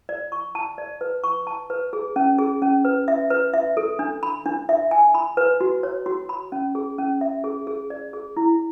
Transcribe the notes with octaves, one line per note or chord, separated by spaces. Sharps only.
D5
C#6
A5
D5
B4
C#6
A5
B4
G#4
C#4
G#4
C#4
B4
E5
B4
E5
A4
D4
B5
D4
E5
G#5
B5
B4
F#4
C#5
F#4
B5
C#4
G#4
C#4
E5
G#4
G#4
D5
G#4
E4